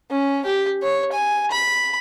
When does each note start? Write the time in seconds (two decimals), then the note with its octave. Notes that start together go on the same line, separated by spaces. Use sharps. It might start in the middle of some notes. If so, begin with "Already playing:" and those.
0.11 C#4
0.46 G4
0.82 C#5
1.12 G#5
1.52 B5